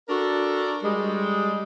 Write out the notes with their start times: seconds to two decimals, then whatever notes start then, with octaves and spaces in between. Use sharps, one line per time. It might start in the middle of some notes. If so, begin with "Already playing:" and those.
0.09 D4 F#4 A4 A#4
0.83 G3 G#3